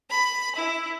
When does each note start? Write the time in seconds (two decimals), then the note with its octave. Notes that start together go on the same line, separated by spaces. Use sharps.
0.10 B5
0.56 E4